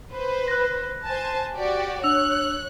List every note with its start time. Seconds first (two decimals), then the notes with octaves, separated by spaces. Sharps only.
0.13 B4 C5
0.48 F#6 A#6
1.06 C5 G#5 A5
1.56 F#4 G4 D5
2.04 D4 C#5 E6 F#6 F7